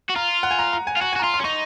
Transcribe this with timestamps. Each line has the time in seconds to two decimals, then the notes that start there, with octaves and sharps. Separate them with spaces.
0.10 F#4
0.16 F4 A#5
0.43 F#5
0.51 G#5
0.59 A#5
0.73 A#5
0.87 G#5
0.97 F4
1.01 F#4 G#5
1.13 F#4 G#5
1.20 A#5
1.23 F4 C6
1.34 C6
1.40 C#4
1.44 D#4 C#6